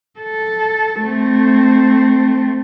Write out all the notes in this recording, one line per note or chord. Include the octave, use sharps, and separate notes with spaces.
A4
A3 C4